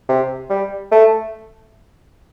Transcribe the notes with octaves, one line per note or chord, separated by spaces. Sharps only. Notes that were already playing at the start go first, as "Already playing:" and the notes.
C3
G3
A3